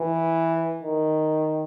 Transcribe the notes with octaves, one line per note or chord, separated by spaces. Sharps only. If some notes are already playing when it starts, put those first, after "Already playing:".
Already playing: E3
D#3